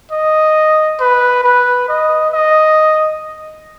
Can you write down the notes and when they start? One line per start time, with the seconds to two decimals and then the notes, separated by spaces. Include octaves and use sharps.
0.12 D#5
1.00 B4
1.44 B4
1.89 D#5
2.34 D#5